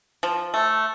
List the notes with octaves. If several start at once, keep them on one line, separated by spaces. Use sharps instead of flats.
F3
A3